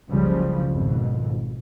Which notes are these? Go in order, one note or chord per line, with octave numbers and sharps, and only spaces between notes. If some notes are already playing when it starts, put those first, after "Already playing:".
F#1 C#2 C#3 F3 G3
G#1 F2 B2